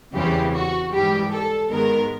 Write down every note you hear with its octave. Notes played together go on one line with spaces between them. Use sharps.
E2 C#3 E3 G3 C4 G4
F#4
G#2 E3 G3 G4
A4
G#2 D#3 G#3 B3 A#4